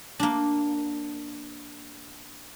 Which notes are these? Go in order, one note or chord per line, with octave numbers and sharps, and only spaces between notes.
A#3 D4